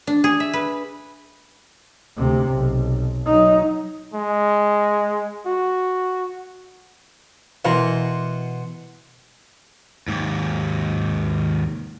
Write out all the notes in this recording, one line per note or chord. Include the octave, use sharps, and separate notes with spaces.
D4
G#4
E5
B4
D2 C3
B1
F#3 D#4
G#3
F#4
B2 E3 A#4 F#5 C6
D#2 G#2